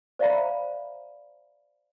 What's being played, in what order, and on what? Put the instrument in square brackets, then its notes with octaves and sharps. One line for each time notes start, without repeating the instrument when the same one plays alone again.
[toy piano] C5 D5 E5 F5 A#5 B5